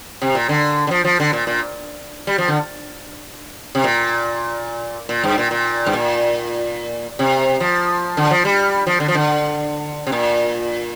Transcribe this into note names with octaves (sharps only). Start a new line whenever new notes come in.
C3
A#2
D3
D3
F3
F3
D3
A#2
A#2
G3
F3
D3
C3
A#2
A#2
G2
A#2
A#2
G2
A#2
C3
F3
D3
F3
G3
F3
D3
F3
D3
C3
A#2